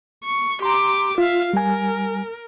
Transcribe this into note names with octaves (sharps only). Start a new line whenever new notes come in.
C#6
G4 A#5 C6 D6
F4 E5 F5
G3 A#4 G#5